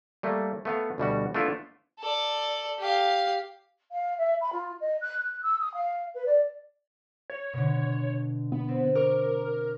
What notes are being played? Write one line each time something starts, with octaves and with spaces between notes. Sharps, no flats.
G3 A3 A#3
A3 B3 F5
D2 B2 G3 F#4
A3 B3 D4 E4 F4
A4 D5
G4 F5
F5
E5
B5
F4
D#5
F#6
F#6
E6
D#6
F5
B4
D5
C#5
B2 D3
B3
C4
A#4 C#6 D6 F6